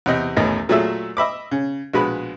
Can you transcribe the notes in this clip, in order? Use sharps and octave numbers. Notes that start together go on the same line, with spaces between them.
E2 C3 D#5
A1 E2 A2 D#3 D#5
A#2 F#3 A3 G#4 E5
D#5 E5 B5 D6
C#3
A#1 B2 G#3 B4 B5